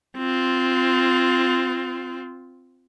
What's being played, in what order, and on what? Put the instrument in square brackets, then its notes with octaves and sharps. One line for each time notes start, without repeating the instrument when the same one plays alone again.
[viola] C4 F4